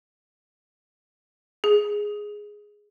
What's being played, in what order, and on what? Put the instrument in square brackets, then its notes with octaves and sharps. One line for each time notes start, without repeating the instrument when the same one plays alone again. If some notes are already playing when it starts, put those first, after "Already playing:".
[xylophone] G#4